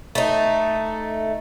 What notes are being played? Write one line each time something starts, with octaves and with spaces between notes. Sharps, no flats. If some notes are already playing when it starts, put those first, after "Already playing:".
A3 D#4